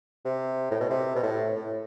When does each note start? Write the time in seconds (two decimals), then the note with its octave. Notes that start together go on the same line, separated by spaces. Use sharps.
0.25 C3
0.71 A2
0.80 B2
0.90 C3
1.15 B2
1.23 A2
1.56 A2